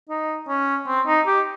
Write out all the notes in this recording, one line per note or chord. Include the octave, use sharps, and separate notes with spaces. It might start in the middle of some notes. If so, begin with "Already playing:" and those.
D#4
C#4
C4
D#4
G4